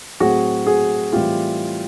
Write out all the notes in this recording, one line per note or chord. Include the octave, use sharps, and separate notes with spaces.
A2 F#3 A3 C4 F#4 G#4
F#4 G#4
A2 E3 G3 C4 F4 G4